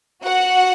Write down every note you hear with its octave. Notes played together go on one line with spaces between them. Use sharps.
F#4 F#5